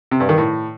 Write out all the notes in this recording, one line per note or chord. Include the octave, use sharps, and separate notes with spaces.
C3
G2
D#3
A2